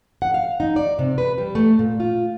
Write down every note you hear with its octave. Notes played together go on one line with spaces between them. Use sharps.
F#5
F5
D#4
D5
C3
B4
G3
A3
A#2
F4